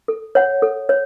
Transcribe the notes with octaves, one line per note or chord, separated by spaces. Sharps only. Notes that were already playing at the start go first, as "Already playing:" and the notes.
A4
C#5 F#5
A4
C#5